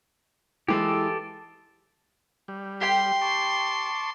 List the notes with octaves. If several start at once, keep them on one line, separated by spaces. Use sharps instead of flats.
E3 G#3 G4 A4
G3
G4 G5 C6
A5 C#6 D6